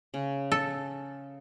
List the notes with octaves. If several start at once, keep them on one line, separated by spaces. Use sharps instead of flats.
C#3
A4